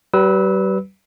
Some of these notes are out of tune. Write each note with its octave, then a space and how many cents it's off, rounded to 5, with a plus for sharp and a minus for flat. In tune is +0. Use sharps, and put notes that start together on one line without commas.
G3 -40 B4 +0 E6 -25